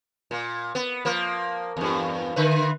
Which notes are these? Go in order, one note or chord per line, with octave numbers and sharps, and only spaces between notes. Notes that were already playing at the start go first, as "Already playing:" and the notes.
A#2
B3
F3 A#3
E2 G2
D3 B4